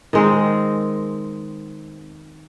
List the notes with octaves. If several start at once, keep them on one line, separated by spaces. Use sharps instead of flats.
D#3 G#3 C4